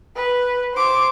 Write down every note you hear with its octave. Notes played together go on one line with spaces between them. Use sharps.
B4
C5 D6